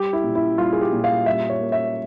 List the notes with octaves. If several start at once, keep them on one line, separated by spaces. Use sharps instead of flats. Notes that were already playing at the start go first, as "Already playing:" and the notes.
Already playing: G3 G4
E4
A#2
E4
G3 F4
G#4
G4
A#2
F5
G3 E5
C#5
A#3
E5